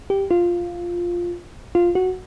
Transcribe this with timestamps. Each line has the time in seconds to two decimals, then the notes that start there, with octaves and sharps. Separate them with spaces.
0.10 G4
0.31 F4
1.75 F4
1.95 F#4